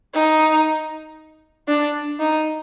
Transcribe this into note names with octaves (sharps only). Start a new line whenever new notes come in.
D#4
D4
D#4